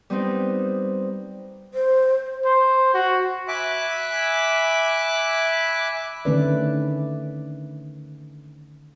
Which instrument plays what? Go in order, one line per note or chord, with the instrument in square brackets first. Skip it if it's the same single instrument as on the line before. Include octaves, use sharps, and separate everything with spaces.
[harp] G3 B3 C4 D#4
[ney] C5
[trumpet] C5
F#4
[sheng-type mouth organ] E5 G#5 B5 D6 F#6
[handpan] D3 D#3 A3 C#4 B4 D5